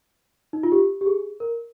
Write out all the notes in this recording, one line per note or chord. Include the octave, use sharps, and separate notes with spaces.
D#4
F4
G4
G4
G#4
A#4